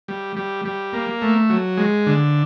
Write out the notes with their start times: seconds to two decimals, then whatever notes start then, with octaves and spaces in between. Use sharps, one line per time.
0.08 G3
0.36 G3
0.65 G3
0.93 A#3
1.22 A3
1.49 F#3
1.77 G#3
2.07 D3